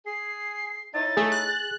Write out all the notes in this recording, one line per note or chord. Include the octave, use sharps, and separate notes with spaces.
G#4 C7
D#4 E4 C#5 A6
A3 G#4
F#6